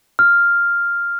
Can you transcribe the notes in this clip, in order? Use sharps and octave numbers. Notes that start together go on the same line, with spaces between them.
F6